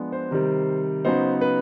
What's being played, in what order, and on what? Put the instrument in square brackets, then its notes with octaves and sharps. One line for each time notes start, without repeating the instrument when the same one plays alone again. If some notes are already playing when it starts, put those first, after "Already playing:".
Already playing: [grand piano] F3 G#3 B3 D4
C5
C3 D#3 G3
C#3 F#3 B3 D#4 C5
B4